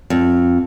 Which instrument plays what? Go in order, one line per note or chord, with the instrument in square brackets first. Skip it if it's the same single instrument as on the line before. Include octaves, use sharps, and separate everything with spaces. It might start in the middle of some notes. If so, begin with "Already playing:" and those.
[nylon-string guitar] F2